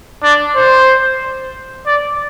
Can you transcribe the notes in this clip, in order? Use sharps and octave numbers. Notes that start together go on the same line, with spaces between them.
D4
C5
D5